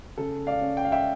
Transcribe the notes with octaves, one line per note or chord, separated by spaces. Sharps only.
C#3 A4
D5 F5
C#4
G5
F5
E5 G5